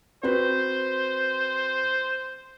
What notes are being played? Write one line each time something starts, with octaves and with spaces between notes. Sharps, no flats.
C4 F#4 B4 C5